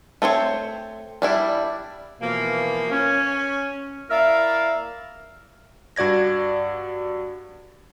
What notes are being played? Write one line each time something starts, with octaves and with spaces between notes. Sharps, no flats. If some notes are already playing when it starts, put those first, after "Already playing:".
A3 C4 C5 C#5
G3 D4 E4
B2 E3 F3 A#3
C#4
A#3 E4 A#4 D5 E5 F5
G2 F#4 D5 G#6 A#6